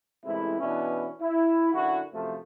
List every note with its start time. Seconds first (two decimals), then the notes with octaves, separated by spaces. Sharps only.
0.24 A1 A2 C3 G#3 E4
0.60 B2 E3 B3 C#4 D4 E4
1.20 E4
1.73 F#2 D3 E4 F#4
2.13 F#2 C3 F3 A3